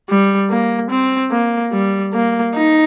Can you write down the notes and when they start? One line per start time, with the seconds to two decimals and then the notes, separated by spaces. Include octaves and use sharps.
0.09 G3
0.51 A#3
0.91 C4
1.32 A#3
1.72 G3
2.14 A#3
2.55 D#4